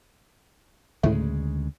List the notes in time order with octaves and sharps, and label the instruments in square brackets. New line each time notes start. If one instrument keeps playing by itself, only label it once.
[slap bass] D2 C#3 G#3 [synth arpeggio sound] A2 A3